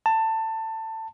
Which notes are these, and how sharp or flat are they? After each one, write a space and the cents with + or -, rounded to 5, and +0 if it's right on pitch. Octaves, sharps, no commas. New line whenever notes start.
A5 +20